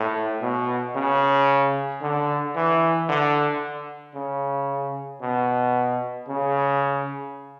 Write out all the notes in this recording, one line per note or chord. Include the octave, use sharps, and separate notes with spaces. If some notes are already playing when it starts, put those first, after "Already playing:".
Already playing: A2
B2
C#3
D3
E3
D3
C#3
B2
C#3